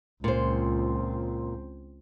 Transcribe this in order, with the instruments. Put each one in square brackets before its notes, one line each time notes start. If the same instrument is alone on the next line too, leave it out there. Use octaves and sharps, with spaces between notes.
[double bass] C#2 C4 [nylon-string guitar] A#2 C5